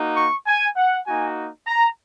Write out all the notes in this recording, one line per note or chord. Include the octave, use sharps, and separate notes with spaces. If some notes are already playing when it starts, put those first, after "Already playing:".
Already playing: A#3 D#4 F#4
C#6
G#5
F#5
A#3 D#4 F#4 G#5
A#5